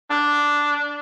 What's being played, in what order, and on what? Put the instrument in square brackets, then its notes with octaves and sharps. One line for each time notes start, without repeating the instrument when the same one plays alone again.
[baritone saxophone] D4